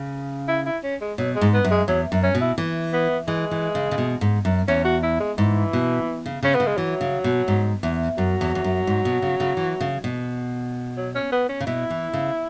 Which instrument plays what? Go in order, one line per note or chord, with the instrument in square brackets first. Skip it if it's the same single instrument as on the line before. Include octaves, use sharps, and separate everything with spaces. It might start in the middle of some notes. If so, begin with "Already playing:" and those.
Already playing: [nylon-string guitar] C#3
[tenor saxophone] E4
E4
C#4
G#3
[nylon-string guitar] B2 [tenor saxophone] F#3
[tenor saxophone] G#3
[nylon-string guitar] G#2
[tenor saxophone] B3
[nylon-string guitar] F#2
[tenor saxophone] G#3
[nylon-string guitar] E2 [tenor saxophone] F#3
[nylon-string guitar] F#2
[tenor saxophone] C#4
[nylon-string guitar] B2
[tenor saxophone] E4
[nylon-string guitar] E3
[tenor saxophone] B3
[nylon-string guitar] E3 [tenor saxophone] G#3
[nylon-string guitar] E3
C#3
C#3
B2
G#2
F#2
[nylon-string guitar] E2 [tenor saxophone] C#4
[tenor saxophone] F#4
E4
G#3
[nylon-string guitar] G#2 [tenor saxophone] E3
[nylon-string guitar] B2
C#3
[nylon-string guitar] C#3 [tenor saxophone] C#4
[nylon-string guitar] C#3 [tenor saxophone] B3
[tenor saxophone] G#3
[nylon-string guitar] E3 [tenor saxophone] F#3
[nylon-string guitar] C#3
B2
G#2
E2
[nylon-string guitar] F#2 [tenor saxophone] F#3
[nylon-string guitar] E2
E2
F#2
G#2
B2
C#3
C#3
E3
C#3
B2
[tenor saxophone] F#3
C#4
B3
C#4
[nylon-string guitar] C#3
[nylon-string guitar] B2 [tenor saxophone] E4
[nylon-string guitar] E3
C#3